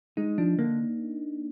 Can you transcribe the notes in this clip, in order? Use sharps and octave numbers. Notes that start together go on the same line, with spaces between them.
G#3 D#4
F3 D4
D3 A#3